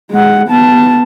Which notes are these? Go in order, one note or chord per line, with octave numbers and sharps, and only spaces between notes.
G#3 F#5
B3 A5